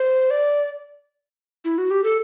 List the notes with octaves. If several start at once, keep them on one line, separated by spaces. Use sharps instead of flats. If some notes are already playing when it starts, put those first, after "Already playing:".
Already playing: C5
D5
E4
F#4
G4
A4